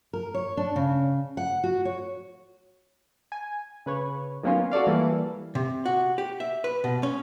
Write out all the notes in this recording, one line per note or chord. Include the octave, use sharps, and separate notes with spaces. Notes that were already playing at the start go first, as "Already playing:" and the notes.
A#4
C#5
D4
C#3
F#5
F#4
C#5
G#5
C#3 B4 C#5
D#3 F#3 A#3 B3 C#4 F4
F#4 A4 D5 F5
E3 G3 A#3 A4
C3
F#4
G4
E5
B4
B2
C#4